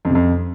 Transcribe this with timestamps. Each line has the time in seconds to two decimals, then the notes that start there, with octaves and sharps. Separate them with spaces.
0.05 F2
0.10 C3
0.15 F2